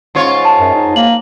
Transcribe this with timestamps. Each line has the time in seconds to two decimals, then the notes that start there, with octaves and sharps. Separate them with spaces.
0.15 G#2 F4 C#5
0.45 A5
0.60 F#2
0.75 D#4
0.96 A#3 F#7